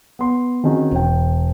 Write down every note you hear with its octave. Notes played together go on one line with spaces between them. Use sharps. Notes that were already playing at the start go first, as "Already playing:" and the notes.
B3 C6
D#3 C4 C#4 D#4 F#4 G#4
E1 G5